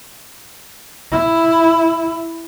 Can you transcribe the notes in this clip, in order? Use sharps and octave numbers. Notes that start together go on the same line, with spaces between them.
E4